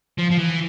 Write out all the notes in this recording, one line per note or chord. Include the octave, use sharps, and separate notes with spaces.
F3
F3
E3